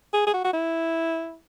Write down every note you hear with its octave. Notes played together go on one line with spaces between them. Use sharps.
G#4
G#4
F#4
F#4
E4